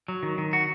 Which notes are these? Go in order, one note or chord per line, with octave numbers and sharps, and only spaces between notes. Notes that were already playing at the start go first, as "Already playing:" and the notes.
F#3
D#3
D#3
F#4